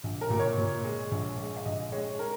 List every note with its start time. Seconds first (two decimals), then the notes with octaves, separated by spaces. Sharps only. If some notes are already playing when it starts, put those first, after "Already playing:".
0.04 A#1
0.21 A#4
0.30 A#2
0.40 C#5
0.58 A#2
0.84 G#3
1.11 A#1
1.38 G#3
1.57 F5
1.65 A#1 D#5
1.92 G#3 C#5
2.19 A#4